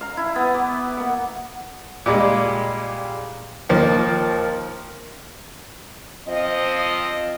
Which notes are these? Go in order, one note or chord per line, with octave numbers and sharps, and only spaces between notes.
F5 A#5
E4
B3
D6
A#3 F#5
A#2 G3 G#3
D#2 F3 A#3
F3 C4 D#5